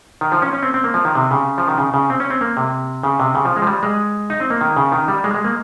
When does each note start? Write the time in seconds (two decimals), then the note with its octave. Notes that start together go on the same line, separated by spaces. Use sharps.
0.21 D#3
0.32 F3
0.42 C#4
0.53 C#4
0.63 C4
0.74 C4
0.84 A#3
0.94 F3
1.05 D#3
1.15 C3
1.31 C#3
1.58 F3
1.68 D#3
1.78 C#3
1.94 C#3
2.10 C4
2.20 C#4
2.30 C4
2.41 A#3
2.57 C3
3.03 C#3
3.20 C3
3.35 C#3
3.45 F3
3.56 G#3
3.62 F3
3.67 G3
3.83 G#3
4.30 D#4
4.40 C4
4.50 A#3
4.61 D#3
4.76 C#3
4.92 D#3
5.08 G3
5.24 G#3
5.35 G#3
5.44 A#3